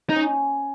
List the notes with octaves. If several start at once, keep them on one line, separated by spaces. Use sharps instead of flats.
D#4
C#4